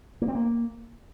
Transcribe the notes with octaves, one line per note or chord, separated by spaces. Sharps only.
A#3
C4
A#3